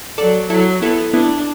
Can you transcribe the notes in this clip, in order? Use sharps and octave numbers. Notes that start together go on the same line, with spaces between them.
F#3 A4 D5
F#3 E4 A4
B3 E4 A4
B3 D4 E4